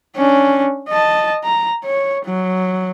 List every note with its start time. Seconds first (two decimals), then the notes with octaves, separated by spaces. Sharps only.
0.17 C#4 D4
0.89 D#5 A5
1.44 A#5
1.85 C#5
2.26 F#3